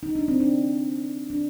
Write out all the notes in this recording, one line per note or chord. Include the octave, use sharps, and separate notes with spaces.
D#4
D4
C4
D4
D4